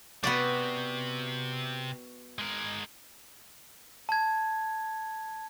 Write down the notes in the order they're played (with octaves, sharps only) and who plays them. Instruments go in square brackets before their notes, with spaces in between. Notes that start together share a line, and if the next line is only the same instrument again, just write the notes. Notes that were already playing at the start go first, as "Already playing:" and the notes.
[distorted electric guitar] C3 [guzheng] B3 F#4 D5
[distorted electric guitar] G#3 A#4
[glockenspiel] A5 G#6